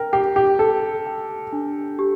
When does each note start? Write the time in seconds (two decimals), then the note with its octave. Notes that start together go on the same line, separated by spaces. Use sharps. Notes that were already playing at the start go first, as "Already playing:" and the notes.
Already playing: A#4 G5
0.13 G4 G5
0.36 G4
0.59 A4 G5
1.06 G5
1.53 D4
1.99 G4